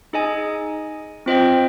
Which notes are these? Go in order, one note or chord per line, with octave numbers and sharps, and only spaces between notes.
D#4 G#4 D#5 G#5
C4 F4 C5 D#5 G5